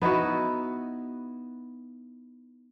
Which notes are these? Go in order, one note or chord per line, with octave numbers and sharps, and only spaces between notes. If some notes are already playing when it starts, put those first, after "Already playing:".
B3 D#4 E4 F#4